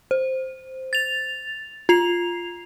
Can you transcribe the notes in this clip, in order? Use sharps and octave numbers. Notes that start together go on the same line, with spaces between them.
C5
A6 F7
F4 C7 F7